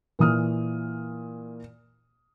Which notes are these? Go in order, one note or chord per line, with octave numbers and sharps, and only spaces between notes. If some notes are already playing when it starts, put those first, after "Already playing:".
A#2 E3 D#6 F6